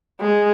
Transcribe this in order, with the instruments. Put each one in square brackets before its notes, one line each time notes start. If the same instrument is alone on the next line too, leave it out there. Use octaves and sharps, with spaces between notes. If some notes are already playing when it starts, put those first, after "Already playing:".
[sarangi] G#3